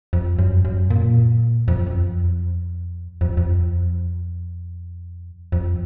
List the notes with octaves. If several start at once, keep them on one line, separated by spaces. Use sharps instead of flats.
F2
F#2
F#2
A#2
F2
F#2
F2
F2
F2
F2